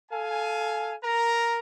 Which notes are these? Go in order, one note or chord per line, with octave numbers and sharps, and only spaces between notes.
A4 F5 G#5
A#4 A#5